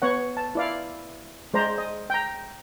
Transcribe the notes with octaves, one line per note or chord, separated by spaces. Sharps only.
B3 C#5 F#5
A5
E4 D5 F5
G#3 C5 D5 A#5
D#5
G5 A#5